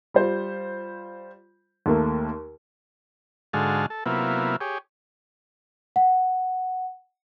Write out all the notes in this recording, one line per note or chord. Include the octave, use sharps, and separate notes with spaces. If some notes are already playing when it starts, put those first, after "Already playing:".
G3 F4 C5
D#2 A3 A#3
G#2 D3 G#3 F#4 A4 F5
A4
C3 F#3 A#3 B3 E4 F4
G4 G#4 C#5
F#5